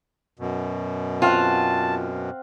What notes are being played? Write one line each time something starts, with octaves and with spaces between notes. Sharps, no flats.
F#2 B2
C4 F4 F5 F#5 A5